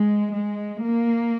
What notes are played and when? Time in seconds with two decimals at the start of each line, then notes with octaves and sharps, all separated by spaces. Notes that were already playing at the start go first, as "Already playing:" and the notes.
Already playing: G#3
0.33 G#3
0.82 A#3